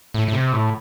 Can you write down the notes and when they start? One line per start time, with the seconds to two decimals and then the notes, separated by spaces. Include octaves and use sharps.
0.14 A2
0.28 A2
0.33 C3
0.53 A2